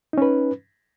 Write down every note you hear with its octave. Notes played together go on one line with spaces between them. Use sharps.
C#4 D#4 B4